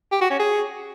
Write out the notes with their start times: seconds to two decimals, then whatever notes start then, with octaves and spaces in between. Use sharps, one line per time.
0.12 G4
0.21 F#4
0.30 C#4
0.39 G#4